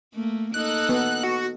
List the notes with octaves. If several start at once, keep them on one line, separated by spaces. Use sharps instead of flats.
A3 A#3
A#3 D#4 A4 F#6
B3
F#4